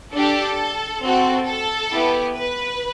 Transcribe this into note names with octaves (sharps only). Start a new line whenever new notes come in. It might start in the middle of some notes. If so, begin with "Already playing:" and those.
D4 G4 A4
C4 F#4 A4
A4
B3 E4 G4
B4